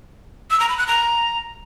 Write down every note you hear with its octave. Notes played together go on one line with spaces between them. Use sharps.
E6
A#5
B5
F#6
A#5